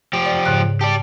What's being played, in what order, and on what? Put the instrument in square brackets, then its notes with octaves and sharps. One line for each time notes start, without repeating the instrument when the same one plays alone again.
[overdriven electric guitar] F3 G4
[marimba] D5
G#2 C#3 F#6
[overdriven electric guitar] G4 D5 [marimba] A5